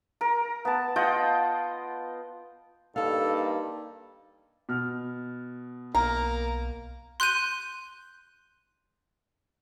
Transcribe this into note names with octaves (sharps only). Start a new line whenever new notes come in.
A#4
B3 A5
F4 D#5 F#5 G5
G2 A#3 D#4 A4 F5 A5
B2 F6
B1 A#3 A#4
C6 F#6 G6 D#7